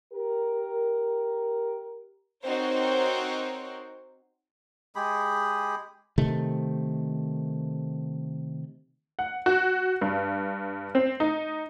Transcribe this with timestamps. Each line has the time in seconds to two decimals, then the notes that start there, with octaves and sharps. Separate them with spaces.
0.13 G4 A#4
2.45 C4 D#4 F#4 A#4 C5 C#5
4.95 G#3 G4 G#4 B5
6.18 C3 D#3 A3
9.19 F#5
9.46 F#4
10.01 G2
10.95 C4
11.20 D#4